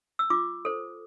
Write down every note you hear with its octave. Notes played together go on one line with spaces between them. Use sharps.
E6
F4 D6
A4 C5